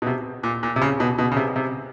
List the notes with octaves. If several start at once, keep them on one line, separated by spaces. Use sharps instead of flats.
B2
C3
A#2
A#2
C3
C#3
B2
B2
C#3
C3
C3